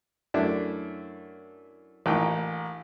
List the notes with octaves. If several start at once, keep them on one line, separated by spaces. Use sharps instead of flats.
F#2 A3 D4 E4
A1 A#2 E3 D#4 G5